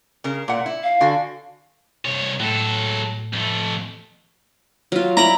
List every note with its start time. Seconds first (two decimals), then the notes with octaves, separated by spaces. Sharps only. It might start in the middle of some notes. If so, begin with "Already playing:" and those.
0.24 C#3 A#4
0.48 A#2 F#5
0.66 E4
0.83 F5
1.01 D3 F#4 G#5
2.06 C2 C#5
2.40 A2 F#3 A4
3.33 F2 A3
4.92 F#3 F4
5.17 E4 D5 A#5 B5